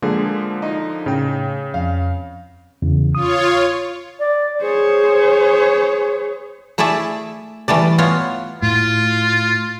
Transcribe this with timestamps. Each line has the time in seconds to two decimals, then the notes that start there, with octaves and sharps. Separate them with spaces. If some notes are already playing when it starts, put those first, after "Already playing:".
0.02 D3 F3 G#3 A#3 G#4
0.62 D#4 D#5
1.06 A2 C#3 C#4 G5
1.74 F2 F5
2.82 E2 C#3
3.15 F4 C#5 D#6
4.19 D5
4.61 G#4 C5 C#5
6.78 A3 E4 G#4 D5 E5
7.68 E3 G3 A3 D5
7.98 B3 F4 C#5
8.62 A2 F4